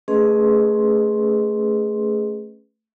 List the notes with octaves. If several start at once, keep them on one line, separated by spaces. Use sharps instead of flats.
A3 C#4 G#4 B4 D#5 C6